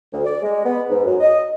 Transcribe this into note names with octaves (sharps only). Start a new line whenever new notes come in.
D2
D5
G#3
B3
G#2
F#2
D#5